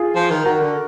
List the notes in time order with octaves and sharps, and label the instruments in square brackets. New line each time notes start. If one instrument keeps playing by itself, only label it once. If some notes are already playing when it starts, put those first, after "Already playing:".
Already playing: [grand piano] F4 G#4
[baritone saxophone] F3
D#3
[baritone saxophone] D#3 [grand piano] F#4 A#4
[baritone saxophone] D3